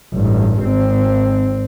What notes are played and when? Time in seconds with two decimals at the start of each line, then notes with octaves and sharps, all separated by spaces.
0.13 A1 G2
0.63 G#1 C4